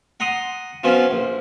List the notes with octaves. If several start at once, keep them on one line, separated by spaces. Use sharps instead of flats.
F#5 A#5 C6 D#6
F3 F#3 B3 C#4 F4
A#1